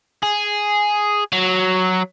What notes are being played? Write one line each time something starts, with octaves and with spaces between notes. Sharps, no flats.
G#4
F#3